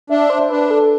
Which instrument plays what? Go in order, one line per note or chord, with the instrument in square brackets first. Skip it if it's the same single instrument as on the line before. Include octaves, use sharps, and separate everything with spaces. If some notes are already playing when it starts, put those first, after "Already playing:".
[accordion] D4 [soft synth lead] E5
[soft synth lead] C5
[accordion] D4 [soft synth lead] B4
[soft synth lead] A4